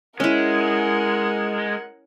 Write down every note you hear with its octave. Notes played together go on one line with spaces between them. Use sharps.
G#3 C#4 E4 A#4 F#5